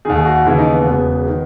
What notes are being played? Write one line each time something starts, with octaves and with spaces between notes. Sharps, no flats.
D#2 D#3 G#4
G#4
F#4
F#4
D#2 C#3 E3 E4
D#4
B3
E1 E2 C#3 B3
D#3